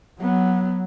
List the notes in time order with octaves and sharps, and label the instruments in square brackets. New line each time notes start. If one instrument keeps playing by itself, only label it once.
[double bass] F#3 [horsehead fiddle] B3